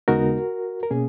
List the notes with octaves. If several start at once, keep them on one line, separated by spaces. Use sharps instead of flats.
D#2 C#3 G#3 B3 D#4 F#4 A#4
A#4
B2 A#3 C#4 G#4